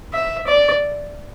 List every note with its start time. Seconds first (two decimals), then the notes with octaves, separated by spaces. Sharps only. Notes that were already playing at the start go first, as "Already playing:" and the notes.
0.14 E5
0.47 D5